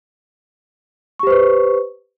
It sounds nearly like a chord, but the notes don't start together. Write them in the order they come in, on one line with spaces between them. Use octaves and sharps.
C#6 G4 C5 B4